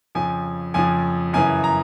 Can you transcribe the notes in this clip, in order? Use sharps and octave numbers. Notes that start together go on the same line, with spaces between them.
F2 C#3 F3 G#5
F2 C#3 F3 G#5
F#2 C#3 E3 G#5
A#5